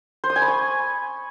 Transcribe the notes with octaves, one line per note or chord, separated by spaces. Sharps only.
C5
D#6
G#5
B5
C#6